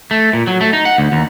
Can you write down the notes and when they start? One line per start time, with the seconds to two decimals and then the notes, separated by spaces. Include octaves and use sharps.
0.11 A3
0.33 A#2
0.47 F#3
0.61 A3
0.73 D#4
0.85 F#5
0.98 D2
1.12 D#2